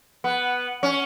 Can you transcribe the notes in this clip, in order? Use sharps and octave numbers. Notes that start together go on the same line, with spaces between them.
B3
C#4